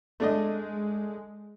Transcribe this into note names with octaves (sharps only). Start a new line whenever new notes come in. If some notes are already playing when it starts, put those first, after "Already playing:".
G#3 A3 D4 D#5